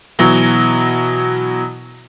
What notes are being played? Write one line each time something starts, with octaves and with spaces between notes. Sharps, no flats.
B2 E3 F#3